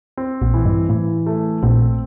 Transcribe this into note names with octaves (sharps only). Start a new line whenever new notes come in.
C4
A#1 A#2
E3
G2
A2 E3
A3
A#1 A#2 C4